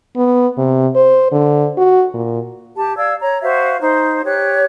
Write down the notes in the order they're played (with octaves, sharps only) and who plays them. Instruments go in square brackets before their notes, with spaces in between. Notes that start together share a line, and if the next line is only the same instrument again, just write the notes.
[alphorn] B3
C3
C5
D3
F#4
A#2
[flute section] G4 A5
D5 F5 E6 G#6
C#5 A#5
F#4 C5 E5 F5
D#4 C5
G4 C#5 F#6